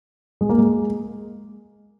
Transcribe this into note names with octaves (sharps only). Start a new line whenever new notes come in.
G#3
A#3
G#3